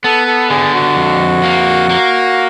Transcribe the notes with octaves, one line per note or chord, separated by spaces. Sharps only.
B3 A4
A4
D3 G#4
F#4
F2
A#3
A#3